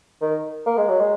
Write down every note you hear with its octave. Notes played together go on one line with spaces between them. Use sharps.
D#3
A#3
G#3
F#3
G#3